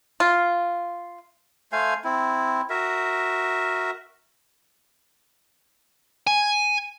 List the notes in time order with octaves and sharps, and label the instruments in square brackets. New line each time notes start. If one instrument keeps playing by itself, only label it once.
[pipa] F4
[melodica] A3 C5 F5 G#5
C4 E4
F#4 A#4 E5
[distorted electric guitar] G#5